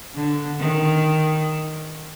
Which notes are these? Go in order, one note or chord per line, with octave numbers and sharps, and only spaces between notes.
D3
D#3